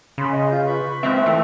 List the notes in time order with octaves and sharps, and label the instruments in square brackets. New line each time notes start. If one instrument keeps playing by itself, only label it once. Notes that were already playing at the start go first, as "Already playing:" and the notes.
[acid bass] C#3 [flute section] B5 C6
[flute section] D#5 G#5
F4 G6
B4 B5 C#6
[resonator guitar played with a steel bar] A#2 G#3 E5 [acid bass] C4
[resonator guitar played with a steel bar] E3 [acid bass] A3 [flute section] G5